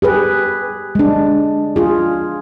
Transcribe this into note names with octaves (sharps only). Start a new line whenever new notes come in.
G4 G#4 B4
G#3 D4
F4 G#4